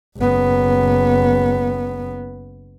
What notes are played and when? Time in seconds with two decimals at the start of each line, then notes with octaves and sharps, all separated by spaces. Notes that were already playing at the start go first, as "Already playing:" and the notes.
0.18 F#1 B3